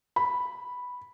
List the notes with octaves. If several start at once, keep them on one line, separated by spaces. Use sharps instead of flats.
B5